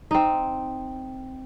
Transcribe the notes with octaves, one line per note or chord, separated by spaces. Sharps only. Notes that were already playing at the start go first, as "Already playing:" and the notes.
C4 D#4